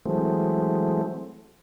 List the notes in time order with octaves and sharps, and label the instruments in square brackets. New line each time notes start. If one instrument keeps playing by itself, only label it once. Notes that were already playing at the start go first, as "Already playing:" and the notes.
[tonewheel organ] E3 F#3 G#3 A3 C4